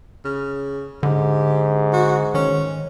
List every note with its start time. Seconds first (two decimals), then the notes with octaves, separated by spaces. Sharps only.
0.25 C#3
1.03 G#2 D3 G4
1.93 F#4
2.34 D#3 C#4